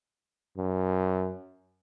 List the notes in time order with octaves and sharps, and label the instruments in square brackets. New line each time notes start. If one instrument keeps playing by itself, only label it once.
[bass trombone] F#2